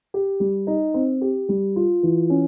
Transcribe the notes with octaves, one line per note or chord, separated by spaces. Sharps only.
G4
G3
D#4
C4
G4
G3
F4
E3
C#4